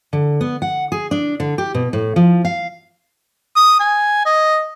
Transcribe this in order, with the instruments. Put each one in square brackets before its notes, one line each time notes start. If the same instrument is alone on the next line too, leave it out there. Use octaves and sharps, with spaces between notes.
[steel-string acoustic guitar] D3
B3
F#5
G#4
D4
D3
G4
B2
A2
F3
F5
[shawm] D#6
G#5
D#5